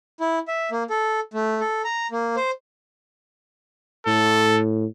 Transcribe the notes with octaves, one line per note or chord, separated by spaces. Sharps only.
E4
E5
A#3
A4
A3
A4
A#5
A#3
C5
A2 A4